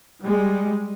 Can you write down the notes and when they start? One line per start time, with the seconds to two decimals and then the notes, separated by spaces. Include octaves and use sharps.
0.22 G3 G#3